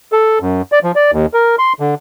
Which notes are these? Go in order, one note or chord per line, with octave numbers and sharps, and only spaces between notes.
A4
F#2
D5
F3
D5
D#2
A#4
C6
D3